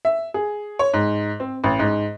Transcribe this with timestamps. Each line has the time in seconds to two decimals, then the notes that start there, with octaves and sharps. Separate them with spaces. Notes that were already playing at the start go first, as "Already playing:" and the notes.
0.05 E5
0.34 G#4
0.79 C#5
0.94 G#2
1.40 C4
1.64 A1
1.79 G#2